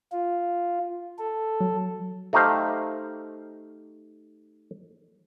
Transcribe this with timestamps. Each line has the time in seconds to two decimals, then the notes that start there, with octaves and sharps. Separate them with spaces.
0.12 F4
1.19 A4
1.61 F#3
2.33 A3 D#4 G4 C5 F5